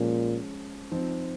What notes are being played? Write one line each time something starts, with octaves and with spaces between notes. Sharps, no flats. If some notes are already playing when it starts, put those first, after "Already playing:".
Already playing: A#2 F3 G#3 C#4
F3 C4 D#4